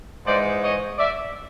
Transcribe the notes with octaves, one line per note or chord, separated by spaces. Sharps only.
G#2 E3 G#3 C5 D5
C#5 D#5
D5 E5